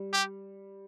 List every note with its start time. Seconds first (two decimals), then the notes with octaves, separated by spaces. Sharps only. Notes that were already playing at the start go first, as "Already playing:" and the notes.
Already playing: G3
0.13 G4